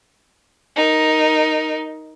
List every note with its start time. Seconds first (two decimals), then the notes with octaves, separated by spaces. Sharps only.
0.76 D#4 A#4